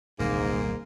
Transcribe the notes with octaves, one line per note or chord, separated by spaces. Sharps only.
D#1 C2 G#2 D3 A#3